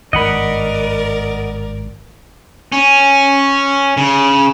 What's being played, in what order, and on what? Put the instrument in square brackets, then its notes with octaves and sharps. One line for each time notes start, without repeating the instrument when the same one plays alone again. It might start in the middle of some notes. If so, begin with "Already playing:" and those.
[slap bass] G#1 G2 [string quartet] A#4 D5 [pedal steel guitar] D#5 F#5 B5
[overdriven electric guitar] C#4
C#3